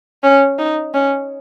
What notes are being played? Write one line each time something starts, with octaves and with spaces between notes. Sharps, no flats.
C#4
D#4
C#4